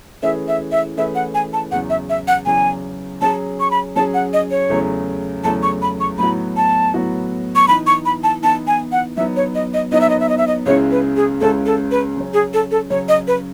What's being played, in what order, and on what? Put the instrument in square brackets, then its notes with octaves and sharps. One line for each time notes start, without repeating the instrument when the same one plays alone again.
[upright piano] E3 A3 C#4 G#4 B4 [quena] E5
[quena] E5
E5
[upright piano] E3 A3 C#4 G#4 B4 [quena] E5
[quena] F#5
G#5
A5
[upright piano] E2 C#3 F#3 [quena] F#5
[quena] E5
E5
F#5
[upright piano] E2 C#3 F#3 [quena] G#5
[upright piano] F#3 C#4 G#4 [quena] A5
[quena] C#6
B5
[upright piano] F#3 C#4 G#4 [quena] A5
[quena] F#5
D#5
C#5
[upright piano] E2 C#3 F#3 A3
[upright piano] E2 C#3 F#3 A3 [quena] A5
[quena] C#6
B5
C#6
[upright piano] A2 F#3 B3 F#4 [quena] B5
[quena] A5
[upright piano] A2 F#3 B3 F#4
[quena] C#6
[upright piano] E3 B3 D#4 [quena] B5
[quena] C#6
B5
A5
[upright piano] E3 B3 D#4 [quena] A5
[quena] G#5
F#5
[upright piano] F#3 B3 D#4 [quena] E5
[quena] C#5
D#5
D#5
[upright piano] F#3 B3 D#4 [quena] D#5
[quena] E5
D#5
E5
D#5
E5
D#5
[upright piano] C#2 C#3 G#3 C#4 E4 [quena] C#5
[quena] B4
G#4
[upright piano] C#2 C#3 G#3 C#4 E4 [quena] A4
[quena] A4
B4
[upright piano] C#3 F#3 C#4
[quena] G#4
A4
A4
[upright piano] C#3 F#3 C#4 [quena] C#5
[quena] D#5
B4